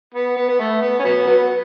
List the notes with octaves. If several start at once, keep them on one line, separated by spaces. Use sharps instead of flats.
B3
B3
B3
A3
B3
C#4
F#3 B3
F#3 B3